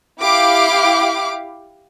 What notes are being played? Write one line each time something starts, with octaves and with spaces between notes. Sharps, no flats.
E4 G4 F5 D6